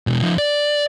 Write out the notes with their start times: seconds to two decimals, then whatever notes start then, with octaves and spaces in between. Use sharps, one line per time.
0.07 B2 G#3
0.22 F3 D#4
0.38 D5